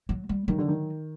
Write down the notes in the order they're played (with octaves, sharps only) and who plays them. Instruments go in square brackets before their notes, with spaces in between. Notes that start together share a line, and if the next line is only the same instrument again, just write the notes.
[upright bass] F#3
G3
[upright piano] D#3 [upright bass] F#3
[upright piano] D3
D#3